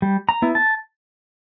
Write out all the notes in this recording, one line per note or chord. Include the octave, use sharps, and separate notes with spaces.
G3
A#5
B3 E4
A5